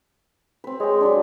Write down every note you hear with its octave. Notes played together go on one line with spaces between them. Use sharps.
C4 B4
G#3 C#5 G5
F#3 G3 D4